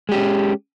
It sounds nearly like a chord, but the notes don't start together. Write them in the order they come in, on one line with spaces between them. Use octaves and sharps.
G#3 G4 C#4